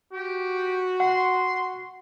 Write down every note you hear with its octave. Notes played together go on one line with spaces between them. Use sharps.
F#4 G4
F#5 C6